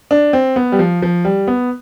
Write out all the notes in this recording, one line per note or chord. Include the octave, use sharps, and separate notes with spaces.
D4
C4
B3
G3
F3
F3
G3
B3